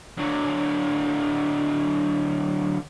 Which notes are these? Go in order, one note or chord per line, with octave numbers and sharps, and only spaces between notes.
D3 F#3